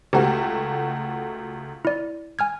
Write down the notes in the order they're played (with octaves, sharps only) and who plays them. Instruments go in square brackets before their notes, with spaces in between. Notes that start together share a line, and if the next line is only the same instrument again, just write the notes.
[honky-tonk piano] C#2 A3 F#4 [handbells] G4
[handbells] E4 D5
G#5 F6 G#6